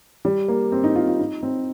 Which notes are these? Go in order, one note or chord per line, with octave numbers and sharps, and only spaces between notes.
G3
A#3
C4
D#4
F4
F4
D#4
C4